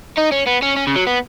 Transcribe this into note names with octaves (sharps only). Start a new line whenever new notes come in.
D#4
C#4
B3
C#4
C#4
C#3
F#3
B3